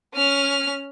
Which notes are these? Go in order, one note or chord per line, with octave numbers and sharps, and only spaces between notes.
C#4 F6